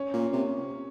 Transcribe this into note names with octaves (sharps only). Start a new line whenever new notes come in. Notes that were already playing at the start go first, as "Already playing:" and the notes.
Already playing: C#4
A#2
C3